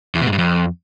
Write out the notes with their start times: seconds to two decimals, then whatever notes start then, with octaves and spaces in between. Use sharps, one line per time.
0.15 E2
0.21 B2
0.27 G#2
0.33 G2
0.39 F2